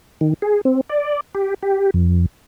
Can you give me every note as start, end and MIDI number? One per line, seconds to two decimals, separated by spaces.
0.21 0.34 51
0.42 0.61 68
0.65 0.81 60
0.89 1.20 74
1.35 1.54 67
1.63 1.90 67
1.94 2.26 41